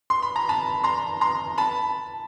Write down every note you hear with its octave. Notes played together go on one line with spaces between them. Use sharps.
C6
B5
A#5
A5 B5
A#5 C6
A#5 C6
A5 B5